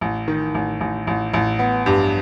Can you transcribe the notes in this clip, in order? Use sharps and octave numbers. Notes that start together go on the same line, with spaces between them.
A1
D#3
A1
A1
A1
A1
B3
G2